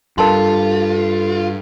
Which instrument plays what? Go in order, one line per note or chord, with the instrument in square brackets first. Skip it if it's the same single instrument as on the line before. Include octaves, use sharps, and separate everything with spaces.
[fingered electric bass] G2 [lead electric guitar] F4 [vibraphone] A4 [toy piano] A#4 A5 C6